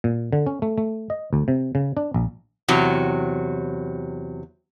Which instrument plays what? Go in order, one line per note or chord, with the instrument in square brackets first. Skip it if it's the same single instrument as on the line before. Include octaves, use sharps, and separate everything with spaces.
[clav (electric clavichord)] A#2
D3
C#4
A3
A3
D#5
D2
C3
C#3
D4
A#1
[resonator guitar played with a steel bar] E2 C3 F#3